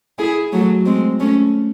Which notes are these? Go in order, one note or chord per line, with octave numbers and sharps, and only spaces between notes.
E4 G#4
F#3 A3
G#3 C4
A3 C#4